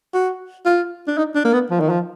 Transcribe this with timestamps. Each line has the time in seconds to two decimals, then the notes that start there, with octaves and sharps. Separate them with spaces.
0.14 F#4
0.65 F4
1.07 D4
1.17 D#4
1.35 D4
1.45 A#3
1.53 B3
1.70 F3
1.80 D#3
1.89 F3